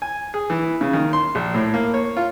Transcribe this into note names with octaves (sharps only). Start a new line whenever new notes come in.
G#5
G#4
E3
C#3
D#3
C6
A#1
A2
A#3
C#5
F4